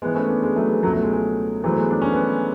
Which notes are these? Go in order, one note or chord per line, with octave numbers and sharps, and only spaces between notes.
G#2 E3 G#3 B3
A3 C#4
B3 D4
G#3
F#3 A3
G#3 B3
C#2 B2 F#3 A3
F#3 A3
G#3
G#3
G#2 E3 F#3 A3
G#3 B3
D4
C#4
B3 D4